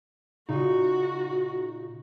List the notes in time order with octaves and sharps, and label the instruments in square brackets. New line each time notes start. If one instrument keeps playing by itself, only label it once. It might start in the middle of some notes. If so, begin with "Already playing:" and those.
[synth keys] A#2 C#3 D#4 [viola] F#4